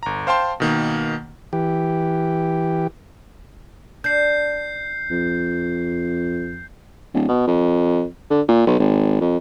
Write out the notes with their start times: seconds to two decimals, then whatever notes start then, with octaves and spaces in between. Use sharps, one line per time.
0.03 G1 A#5
0.27 C5 F5 G5 A5 C6
0.60 B2 D#3 A#3
1.53 E3 G4
4.04 D4 G6 C7
5.11 F2
7.14 D1
7.29 B2
7.47 F2
8.30 D3
8.49 A#2
8.67 B1
8.80 G#1
9.21 F2